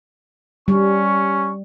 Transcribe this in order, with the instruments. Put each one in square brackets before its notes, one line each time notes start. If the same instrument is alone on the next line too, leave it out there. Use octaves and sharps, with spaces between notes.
[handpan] G3 [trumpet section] C#4 C#6